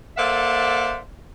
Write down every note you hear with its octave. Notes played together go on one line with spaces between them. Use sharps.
A#3 A4 C5 D5 E5 F#5